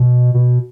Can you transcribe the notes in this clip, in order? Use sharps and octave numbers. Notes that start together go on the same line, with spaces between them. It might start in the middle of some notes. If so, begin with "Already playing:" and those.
Already playing: B2
B2